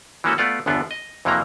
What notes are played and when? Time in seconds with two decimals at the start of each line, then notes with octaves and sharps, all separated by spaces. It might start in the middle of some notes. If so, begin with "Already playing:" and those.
0.24 E3 G#3 A#3 C#4 F#4 A4
0.38 A3 B3 F4 D5 F#5
0.66 G1 E2 D3 B3 D4 F4
0.91 D#5
1.25 F2 C3 E3 F#3 A#3 A#5